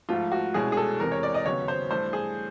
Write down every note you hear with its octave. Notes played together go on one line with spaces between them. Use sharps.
G#2 F3 A3 F4
F#4
C2 B2 G#3 C#4 E4 G#4
G#4
A4
E2 C3 E3 G#3 C4 A#4
C#5
D5
D#5
D#2 C#3 F#3 B3 C#5
C5
G2 E3 A3 C5
G#4